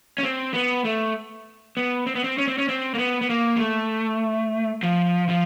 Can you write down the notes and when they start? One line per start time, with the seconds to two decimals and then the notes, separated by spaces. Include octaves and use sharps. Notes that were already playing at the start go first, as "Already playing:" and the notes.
0.18 C#4
0.24 C4
0.54 B3
0.85 A3
1.77 B3
2.06 C4
2.15 B3
2.24 C4
2.38 C#4
2.48 C4
2.58 C#4
2.69 C4
2.94 A#3
2.99 B3
3.21 B3
3.29 A#3
3.56 G#3
3.60 A3
4.83 F3
5.29 F3